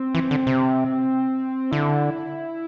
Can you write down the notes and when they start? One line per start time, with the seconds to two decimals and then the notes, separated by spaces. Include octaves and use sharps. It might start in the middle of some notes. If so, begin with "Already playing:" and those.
Already playing: C4
0.15 E3
0.31 D3
0.47 C3
1.71 D3 E4